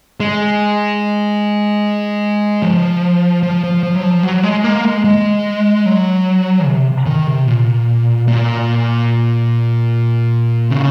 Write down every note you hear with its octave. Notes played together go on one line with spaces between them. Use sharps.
G#3
F3
F3
F3
F3
F#3
F3
F#3
G#3
A#3
G#3
G#3
F#3
C3
D#3
C3
A#2
A#2
C#3